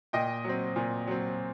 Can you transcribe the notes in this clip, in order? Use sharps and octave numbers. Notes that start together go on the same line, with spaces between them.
A#2 D#5 G5
F#3 C4
A#2
F#3 C4